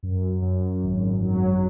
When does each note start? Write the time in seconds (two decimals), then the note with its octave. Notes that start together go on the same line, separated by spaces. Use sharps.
0.03 F#2
0.42 F#2
0.83 G#1
1.22 F#3